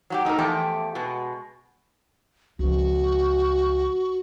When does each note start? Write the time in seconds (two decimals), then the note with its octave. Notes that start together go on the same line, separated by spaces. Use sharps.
0.10 F#3 F#4 G4
0.25 A3 D#4 G#4 A#4
0.39 E2 F3 A3 G4 G5
0.95 B2 G#3
2.59 C#2 F3 F#4